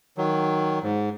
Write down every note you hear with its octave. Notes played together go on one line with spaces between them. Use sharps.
D#3 F#3
G#2